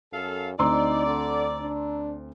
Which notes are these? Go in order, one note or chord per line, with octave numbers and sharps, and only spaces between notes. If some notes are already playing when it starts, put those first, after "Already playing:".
F#2 A4 F5
D2 C4 D#4 D5 A#5 C6 E6
D3
D4